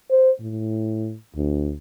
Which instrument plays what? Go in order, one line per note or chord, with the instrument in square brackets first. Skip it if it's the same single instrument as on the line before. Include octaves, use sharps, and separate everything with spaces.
[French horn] C5
A2
D2